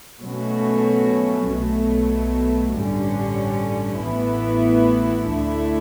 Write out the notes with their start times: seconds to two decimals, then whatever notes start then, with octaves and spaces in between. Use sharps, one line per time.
0.21 B2 F#3 A3 C#4 F#4
1.47 B1 B2 F#3 A3
2.74 A1 G2 D3 G3 C#4
4.00 A1 A2 E3 B3 E4
5.26 D2 D3 A3 E4